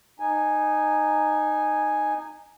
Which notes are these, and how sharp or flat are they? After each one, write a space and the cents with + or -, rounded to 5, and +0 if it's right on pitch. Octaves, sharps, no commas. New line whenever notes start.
D#4 -15 G#5 +0